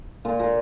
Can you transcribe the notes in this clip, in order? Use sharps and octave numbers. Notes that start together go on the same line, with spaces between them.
A#2 F4
A#2